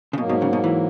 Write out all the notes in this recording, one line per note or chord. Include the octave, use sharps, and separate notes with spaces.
C#3
G#2 B2 F#3 A#3
B2
C#3
B2
E3